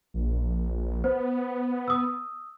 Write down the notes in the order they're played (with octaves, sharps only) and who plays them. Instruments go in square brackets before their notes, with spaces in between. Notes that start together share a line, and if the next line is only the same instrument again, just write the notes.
[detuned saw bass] A#1
[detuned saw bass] B3 [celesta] C5
[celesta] D#6 E6